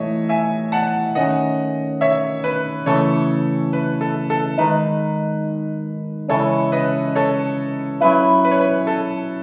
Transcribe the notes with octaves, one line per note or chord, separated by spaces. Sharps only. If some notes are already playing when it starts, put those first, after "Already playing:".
Already playing: A2 E3 A3 C#5 D#5 E5
E5 G#5
F#5 A5
D#3 A3 C#4 D#5 F#5
C#5 E5
B4
C#3 E3 A3 A4 C#5
B4
A4
A4
D#3 G#3 D#4 B4
C#3 E3 G#3 C#4 E4 A4 C#5
B4 D#5
A4 C#5
F#3 C#4 E4 B4
B4
C#5
B4
A4